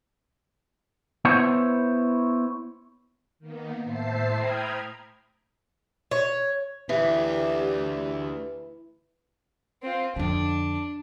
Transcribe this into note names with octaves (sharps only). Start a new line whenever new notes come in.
B3 E4 C5 C#5
D#3 A#3 B3
A2 C5 E5 A5 C7
G5 A#5 B5 D#6 F6 G#6
C#5
D2 E3 G4 E5
C4 F4
F2 D3 D4